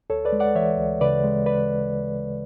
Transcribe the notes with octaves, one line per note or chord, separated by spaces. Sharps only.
D2 A4 C#5
B4 D5
G#3
D5 F#5
E3 C#5 E5
D2
C#3 B4 D5
G#3
B4 D5